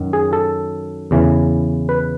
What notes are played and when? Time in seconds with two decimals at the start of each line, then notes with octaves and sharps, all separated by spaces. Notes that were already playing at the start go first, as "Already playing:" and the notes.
Already playing: F#2 D#3 F#3
0.13 G#4
0.33 A4
1.11 E2 C#3 E3
1.89 B4